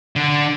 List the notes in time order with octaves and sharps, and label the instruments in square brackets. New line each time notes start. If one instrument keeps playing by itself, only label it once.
[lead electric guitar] D3